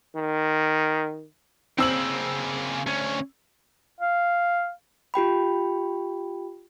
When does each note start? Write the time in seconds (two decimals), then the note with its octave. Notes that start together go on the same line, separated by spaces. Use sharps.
0.16 D#3
1.78 C#3 A#3 C4 E6 F#7
2.86 D2 C#4
4.00 F5
5.14 F4 G4 G5 B5